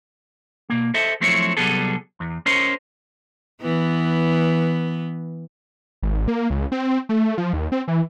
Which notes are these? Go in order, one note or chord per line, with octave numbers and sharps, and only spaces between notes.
B2 A#3
A4 C5 D#5 E5
F3 F#3 A3 C4 E4 C#5
C2 F#3 G3 B3 G#4 A4
E2
C#4 A#4 C5 C#5 D#5
E3 B3
G#1
A#3
C#2
C4
A3
F3
D#2
C4
E3